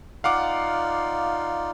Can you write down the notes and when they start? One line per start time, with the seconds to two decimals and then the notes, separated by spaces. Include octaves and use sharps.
0.24 D#4 F4 D5 F5 F#5 D6